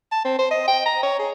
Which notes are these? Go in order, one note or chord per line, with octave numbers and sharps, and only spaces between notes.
A5
C4
C5
D#5
G5
A#5
C#5
G#4